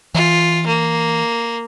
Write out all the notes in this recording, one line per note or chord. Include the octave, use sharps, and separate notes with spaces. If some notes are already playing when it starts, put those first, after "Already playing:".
E3 F4
A#3